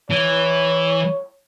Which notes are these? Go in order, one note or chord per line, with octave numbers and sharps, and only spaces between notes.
E3 C#5